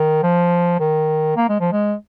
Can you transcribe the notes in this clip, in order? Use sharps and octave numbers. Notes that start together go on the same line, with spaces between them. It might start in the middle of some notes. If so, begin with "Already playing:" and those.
Already playing: D#3
F3
D#3
A#3
G#3
F3
G#3